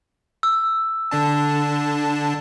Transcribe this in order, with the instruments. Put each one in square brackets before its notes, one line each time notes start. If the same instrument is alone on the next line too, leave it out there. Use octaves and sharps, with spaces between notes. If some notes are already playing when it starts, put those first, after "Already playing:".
[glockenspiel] E6
[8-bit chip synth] D3 D4 A5